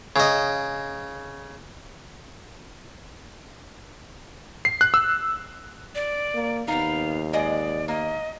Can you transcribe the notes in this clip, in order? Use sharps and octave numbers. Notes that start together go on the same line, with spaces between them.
C#3 D#5
C7
F#6
E6
D5
A#3
D#2 B3 D#4 F5
G#3 D5 D#5
A#3 D#5